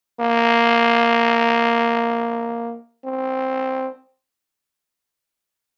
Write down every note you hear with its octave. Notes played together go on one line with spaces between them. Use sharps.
A#3
C4